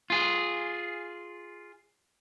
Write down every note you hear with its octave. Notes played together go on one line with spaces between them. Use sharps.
F4 G#4